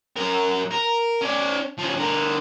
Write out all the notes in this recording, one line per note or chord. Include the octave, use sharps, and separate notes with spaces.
F#2 A#4
A#4
C#4 D5
F3 C#4
D3 A#4